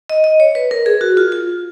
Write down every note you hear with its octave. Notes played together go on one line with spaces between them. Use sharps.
D#5
D#5
C#5
B4
A#4
G#4
F#4
F4
F4